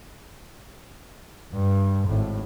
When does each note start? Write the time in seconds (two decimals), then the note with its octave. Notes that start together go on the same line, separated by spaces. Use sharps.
1.52 G2
2.06 G#1 A2